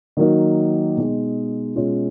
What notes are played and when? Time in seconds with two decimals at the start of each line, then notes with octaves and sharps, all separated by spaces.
0.17 D#3 F#3 A#3 D#4
0.97 B2 G#3 D#4
1.76 B2 G#3 C#4 F4